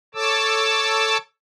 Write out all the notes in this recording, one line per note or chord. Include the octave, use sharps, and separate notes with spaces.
A4 C#5 A5 D6 E6